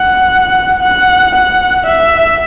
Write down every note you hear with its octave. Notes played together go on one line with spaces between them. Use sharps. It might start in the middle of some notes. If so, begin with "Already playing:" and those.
Already playing: F#5
F#5
F#5
E5